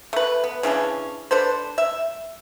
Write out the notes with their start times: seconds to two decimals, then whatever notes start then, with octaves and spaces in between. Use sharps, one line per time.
0.13 A3 B4
0.44 B3
0.63 C#3 E3 C#4 D4
1.31 D4 A4 B4 C5
1.78 E5